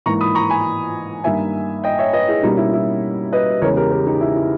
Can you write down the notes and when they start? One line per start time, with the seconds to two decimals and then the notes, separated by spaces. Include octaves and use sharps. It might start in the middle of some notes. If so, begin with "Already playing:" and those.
0.06 G#2 E3 A#3 A#5 C#6
0.21 B5 D#6
0.35 A#5 C#6
0.50 G#5 B5
1.24 G2 D#3 A#3 E5 G#5
1.84 D#5 G5
1.99 C#5 E5
2.13 B4 D#5
2.28 E4 G#4
2.43 B2 G3 A#3 C#4 D#4 G4
2.57 E4
2.73 E4
3.33 B4 D#5
3.62 E2 C#3 G#3 A#4 C#5
3.76 G4 A#4
3.92 G4 A#4
4.06 D#4 G4
4.21 E4
4.36 E4